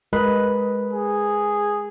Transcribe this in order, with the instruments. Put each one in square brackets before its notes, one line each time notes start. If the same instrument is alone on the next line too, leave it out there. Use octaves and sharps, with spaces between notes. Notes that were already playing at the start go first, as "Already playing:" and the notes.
[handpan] G#3 A#4 D#5 [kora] B4
[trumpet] G#4